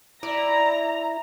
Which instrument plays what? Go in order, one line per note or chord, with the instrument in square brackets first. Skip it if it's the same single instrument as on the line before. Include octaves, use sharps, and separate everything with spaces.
[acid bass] E4 [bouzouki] D5 [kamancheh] A#5